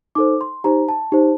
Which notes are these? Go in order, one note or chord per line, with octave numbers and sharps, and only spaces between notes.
D#4 A4 C5 D6
C6
D#4 G4 C5 A#5
A5
D#4 G4 C5